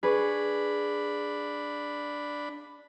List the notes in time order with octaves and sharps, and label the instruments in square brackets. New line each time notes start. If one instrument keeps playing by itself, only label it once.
[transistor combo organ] D4 B5 [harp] G#4 B4 C#6